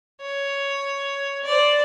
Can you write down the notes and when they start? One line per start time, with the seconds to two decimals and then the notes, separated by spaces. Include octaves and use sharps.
0.21 C#5
1.44 C5 D5